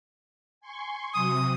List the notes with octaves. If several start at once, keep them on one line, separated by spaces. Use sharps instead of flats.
G#5 C6 C#6
C3 F#3 D#6